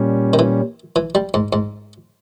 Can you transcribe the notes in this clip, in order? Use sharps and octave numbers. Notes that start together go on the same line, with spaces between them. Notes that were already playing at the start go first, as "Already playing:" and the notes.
Already playing: A#2 G3 C#4
D#3
E3
E3
G3
G#2
G#2